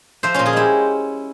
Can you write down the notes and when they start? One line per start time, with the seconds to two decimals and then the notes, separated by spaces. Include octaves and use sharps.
0.23 F3 C5 E5
0.34 A#2 C#4 F4
0.46 F4 G#4
0.53 G#3 E4 G4